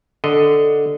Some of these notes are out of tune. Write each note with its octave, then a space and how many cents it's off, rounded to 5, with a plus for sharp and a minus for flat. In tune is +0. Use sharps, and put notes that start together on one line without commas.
D3 +0 D#5 +0